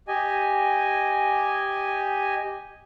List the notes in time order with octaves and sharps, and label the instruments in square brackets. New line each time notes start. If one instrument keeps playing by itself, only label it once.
[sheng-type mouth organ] G4 D#5 G#5